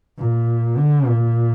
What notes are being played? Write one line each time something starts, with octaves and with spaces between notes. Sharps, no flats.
A#2
D3
A#2